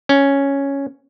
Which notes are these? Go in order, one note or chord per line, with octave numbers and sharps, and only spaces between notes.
C#4